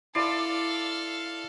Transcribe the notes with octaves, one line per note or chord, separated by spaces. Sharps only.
E4 A4 D5 F5 C6 C7